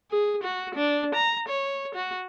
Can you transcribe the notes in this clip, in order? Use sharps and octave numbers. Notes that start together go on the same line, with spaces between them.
G#4
F#4
D4
A#5
C#5
F#4